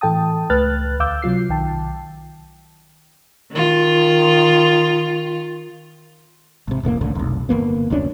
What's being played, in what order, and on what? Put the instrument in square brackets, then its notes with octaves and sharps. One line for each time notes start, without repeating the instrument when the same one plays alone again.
[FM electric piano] A2 E3 A4 G5 A5 D#6
C#2 A3 B4 F6 F#6 A6
D2 F5 D6 E6 G6
C3 F#3 F4 C7
B1 D#3 G5 A5
[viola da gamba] D#3 F4
[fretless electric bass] G#1 C3
E1 A1 A3 A#3
C2 A2 D3
F1 B1
G1 E2 A#3 B3
F1 D2 C#4 D4